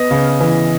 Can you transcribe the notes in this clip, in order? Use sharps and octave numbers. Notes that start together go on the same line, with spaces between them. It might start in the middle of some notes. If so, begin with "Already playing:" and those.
Already playing: B3 D#5
C#3
E3